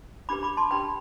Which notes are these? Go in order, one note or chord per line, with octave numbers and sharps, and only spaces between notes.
D4 G4 B4 B5 D6
B5 D6
A5 C6
D4 G4 B4 G5 B5